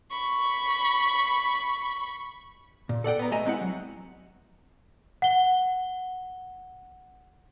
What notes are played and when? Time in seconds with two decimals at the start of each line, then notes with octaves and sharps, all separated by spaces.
0.11 B5 C#6
2.89 A#2
3.04 A4 D5 F#5 G5
3.19 B3 A#5
3.31 A3 D#5 E5 G#5 A#5
3.45 G#3 C4 E4 F#5
3.61 F#3
5.22 F#5 G7